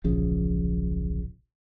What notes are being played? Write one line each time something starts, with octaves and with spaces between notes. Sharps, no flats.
D1 A#1 C#3 F3